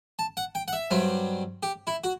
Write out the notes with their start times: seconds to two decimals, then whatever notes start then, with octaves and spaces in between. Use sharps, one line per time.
0.19 A5
0.37 F#5
0.55 G5
0.68 F#5
0.73 E5
0.91 G2 F#3 C4
1.63 G4
1.87 E4
2.04 F#4